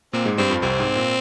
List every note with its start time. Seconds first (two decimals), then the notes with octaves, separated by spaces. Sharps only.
0.13 A#2 A#3 C4
0.26 G#2 G#3
0.38 G2 G3 C4
0.50 F2 F3
0.62 C2 C3 C4
0.80 G#2
0.96 A#2